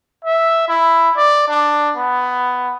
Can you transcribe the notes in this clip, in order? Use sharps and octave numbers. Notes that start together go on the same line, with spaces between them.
E5
E4
D5
D4
B3